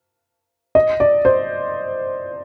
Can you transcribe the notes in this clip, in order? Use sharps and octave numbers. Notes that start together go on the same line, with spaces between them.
D#5
D5
C5